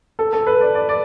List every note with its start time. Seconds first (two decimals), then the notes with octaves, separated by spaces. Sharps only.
0.19 A4
0.33 A4
0.47 B4
0.61 D5
0.75 D5
0.89 D5